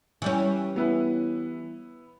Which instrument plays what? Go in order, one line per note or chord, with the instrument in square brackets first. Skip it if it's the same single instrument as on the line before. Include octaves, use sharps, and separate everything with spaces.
[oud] E3 G3 C#4
[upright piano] B3 E4 B4